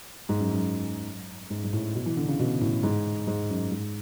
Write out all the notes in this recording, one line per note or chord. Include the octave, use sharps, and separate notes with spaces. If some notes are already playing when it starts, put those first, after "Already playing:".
G#2
F#2
F#2
G#2
G#2
A2
B2
E3
D3
C#3
B2
A2
G#2
G#2
F#2
G#2